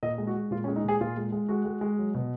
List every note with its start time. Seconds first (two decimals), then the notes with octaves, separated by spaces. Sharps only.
0.03 A#2 D#5
0.18 G#3
0.27 F#4
0.34 G#3
0.51 A#2 F4
0.64 C#4
0.67 G#3
0.76 D#4
0.84 A#2 G#4
1.01 A#2 F4
1.17 G#3
1.32 G#3
1.49 G#3 F#4
1.65 G#3
1.81 G#3
1.99 F#3
2.14 B2